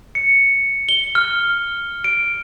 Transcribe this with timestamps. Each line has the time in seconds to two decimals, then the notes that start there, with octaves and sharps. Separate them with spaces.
0.15 C#7
0.89 G7
1.15 F6
2.04 D7